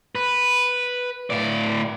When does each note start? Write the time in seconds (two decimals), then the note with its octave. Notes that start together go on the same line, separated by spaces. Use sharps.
0.15 B4
1.30 A2 D5